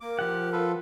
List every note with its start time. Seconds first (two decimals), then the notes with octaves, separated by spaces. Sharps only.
0.01 A#3 A#4 D6
0.19 F3 G4 F#5
0.53 F4 A4 B4